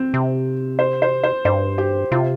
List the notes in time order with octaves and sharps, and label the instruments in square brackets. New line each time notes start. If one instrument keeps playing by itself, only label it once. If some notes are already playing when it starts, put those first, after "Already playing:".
Already playing: [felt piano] C4
[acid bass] C3
[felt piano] C5
C5
C5
[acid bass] G2 [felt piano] C5
[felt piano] G4
[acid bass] C3 [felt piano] F4